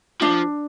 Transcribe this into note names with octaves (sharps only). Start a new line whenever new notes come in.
F3 D4